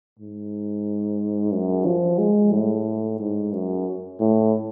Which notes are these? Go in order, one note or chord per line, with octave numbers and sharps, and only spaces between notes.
G#2
F#2
F3
G#3
A2
G#2
F#2
A2